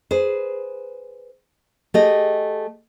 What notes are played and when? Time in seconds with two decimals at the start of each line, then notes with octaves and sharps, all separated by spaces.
0.11 G#4 B4 C5
1.94 A3 G4 G#4 D#5